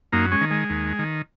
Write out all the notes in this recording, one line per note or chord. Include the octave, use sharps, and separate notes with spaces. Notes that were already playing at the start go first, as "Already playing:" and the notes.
F#2 A#3 D#4
G#3 C#4
D#3
G#3
D#2
D#3